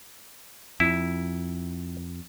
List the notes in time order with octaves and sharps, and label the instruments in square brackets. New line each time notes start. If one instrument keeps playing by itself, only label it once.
[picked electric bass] F2 [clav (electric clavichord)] E4